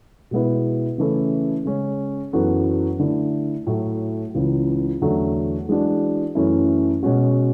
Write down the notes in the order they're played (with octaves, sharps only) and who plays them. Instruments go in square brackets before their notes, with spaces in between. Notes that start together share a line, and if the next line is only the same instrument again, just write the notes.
[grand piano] B2 G#3 B3 E4
C#3 E3 A3 C#4 E4
C#3 G#3 C#4
F#2 E3 B3 F#4 A4
D3 A3 E4
A2 F#3 A3
C#2 C#3 E3
E2 D3 F#3 A3
E3 G#3 D4 F#4
F#2 E3 A3 C#4 E4
B2 G#3 C#4 F#4